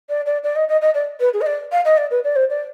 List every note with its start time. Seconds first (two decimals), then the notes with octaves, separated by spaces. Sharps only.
0.09 D5
0.26 D5
0.43 D5
0.56 D#5
0.68 D#5
0.81 D#5
0.94 D5
1.20 B4
1.33 G#4
1.41 D#5
1.46 D5
1.72 F5
1.85 D#5
1.97 D5
2.11 B4
2.24 D5
2.36 C5
2.50 D5